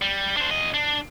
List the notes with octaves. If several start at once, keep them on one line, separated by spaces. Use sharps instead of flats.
G3
D4 C5
E2 D#5
D4